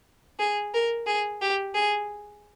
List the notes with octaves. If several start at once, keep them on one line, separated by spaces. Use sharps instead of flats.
G#4
A#4
G#4
G4
G#4